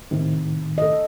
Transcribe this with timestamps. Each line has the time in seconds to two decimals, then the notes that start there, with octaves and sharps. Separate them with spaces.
0.11 A2 C3 D#3
0.78 A4 D#5